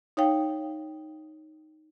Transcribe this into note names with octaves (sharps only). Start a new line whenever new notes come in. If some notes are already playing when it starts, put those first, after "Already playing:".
D#4 C#5 F5 G5